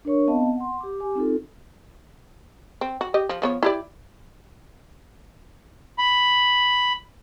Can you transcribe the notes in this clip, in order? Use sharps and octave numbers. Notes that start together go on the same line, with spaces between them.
D4 A#4 C#5 C#6
B3 C4 D#5 F5 A5
F#5 C6
G4 D6
G4 G#5 D6
C4 D#4 F4 A4
C4
F#4
G4 D#5
F3
F3 B3 C#5
E4 G4 D5
B5